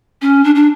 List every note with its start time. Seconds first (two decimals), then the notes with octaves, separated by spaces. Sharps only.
0.22 C#4
0.44 D4
0.55 D4